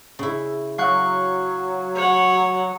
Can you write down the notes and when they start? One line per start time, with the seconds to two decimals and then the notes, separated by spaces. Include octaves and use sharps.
0.19 C#3 E4
0.78 F#3 F5 C#6 F#6
1.95 C#5 F#5